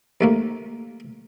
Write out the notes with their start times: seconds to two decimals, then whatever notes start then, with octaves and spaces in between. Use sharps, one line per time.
0.21 D#2 A3 A#3